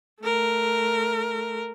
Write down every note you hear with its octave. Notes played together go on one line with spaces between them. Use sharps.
A3 A#4